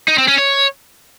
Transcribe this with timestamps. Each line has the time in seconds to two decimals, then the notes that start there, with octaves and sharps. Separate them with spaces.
0.08 D#4
0.18 C4
0.28 C#4
0.38 C#5